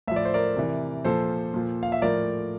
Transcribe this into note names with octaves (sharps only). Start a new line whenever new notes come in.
A2 F3 E5
D5
C5
A#4 D5
C3 E3
A#2 F3 A4 C5
A#2 F3
F5
E5
A2 F3 A#4 D5